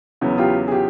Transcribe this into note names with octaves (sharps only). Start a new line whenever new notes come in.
E2 C#3 F#3 B3 E4
F4 G4
G#4
F4 G4